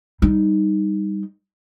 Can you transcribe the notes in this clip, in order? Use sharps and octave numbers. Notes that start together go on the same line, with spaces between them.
G3 D#4